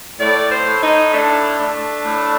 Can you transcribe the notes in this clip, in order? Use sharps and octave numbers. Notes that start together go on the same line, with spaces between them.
A2 D5
C5
A2
D#4
A3 D4
A3 D4
A2